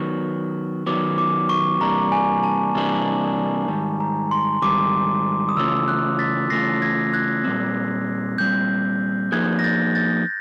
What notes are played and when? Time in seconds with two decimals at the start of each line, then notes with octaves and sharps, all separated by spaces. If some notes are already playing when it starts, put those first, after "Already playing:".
Already playing: D#3 F#3 B3 C#6
0.87 D#3 F#3 B3 D6
1.18 D6
1.49 C#6
1.80 C3 E3 G3 A#3 D4 A#5
2.12 G#5
2.43 A5
2.75 C3 E3 G3 A#3 D4
3.68 G#2 D#3 G3 A5
4.00 A#5
4.31 C6
4.62 G#2 D#3 G3 D6
5.49 D#6
5.57 C#3 E3 A3 C#4 F4 E6
5.88 F#6
6.19 A6 B6
6.50 C#3 E3 A3 C#4 F4 A#6 C7
6.82 G#6 A#6
7.13 F#6 G#6
7.44 A#2 G3 C4
8.38 A#2 G3 C4 G6
9.32 F3 A#3 D#4 G#4 B4 F#6 G#6
9.59 A#6
9.64 G6 A6
9.95 G6 A6